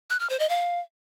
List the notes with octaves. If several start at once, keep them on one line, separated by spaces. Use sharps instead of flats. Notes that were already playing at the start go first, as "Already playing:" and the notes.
F#6
F6
C5
D#5
F5